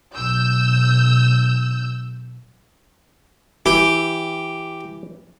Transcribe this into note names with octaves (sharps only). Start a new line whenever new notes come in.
B1 E6 G6
E3 G4